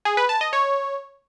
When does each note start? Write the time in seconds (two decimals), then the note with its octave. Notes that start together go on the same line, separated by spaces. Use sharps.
0.05 G#4
0.17 B4
0.29 A5
0.41 D#5
0.53 C#5